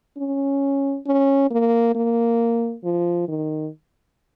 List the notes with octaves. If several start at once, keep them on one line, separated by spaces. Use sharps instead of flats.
C#4
C#4
A#3
A#3
F3
D#3